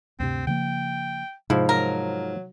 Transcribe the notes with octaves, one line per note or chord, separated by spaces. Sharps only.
D2 G2 C3 C4
C#3 F3 A#3 G5
G#2 C3 F3 E4
F#3 A#4